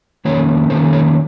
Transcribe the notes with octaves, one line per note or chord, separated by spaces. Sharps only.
F2 D#3 A#3 C#4 C#5
F2 D#3 A#3 C#4 C5
C#5